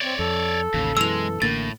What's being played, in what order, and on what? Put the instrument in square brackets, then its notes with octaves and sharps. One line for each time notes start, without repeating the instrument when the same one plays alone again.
[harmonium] C4 [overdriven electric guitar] C#5 D5
[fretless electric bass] F2 [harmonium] A4
[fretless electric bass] A1 D#2 [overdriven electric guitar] C#3
[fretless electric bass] F#2 B2 E3 [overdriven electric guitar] G#3 [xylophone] E6 F7
[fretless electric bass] A1 D3 A#3 [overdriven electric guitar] A2 [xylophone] A6